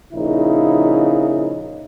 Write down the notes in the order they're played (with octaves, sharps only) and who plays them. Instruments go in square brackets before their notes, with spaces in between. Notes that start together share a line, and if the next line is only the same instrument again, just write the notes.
[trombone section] A#1 C#3 E4 [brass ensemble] D#4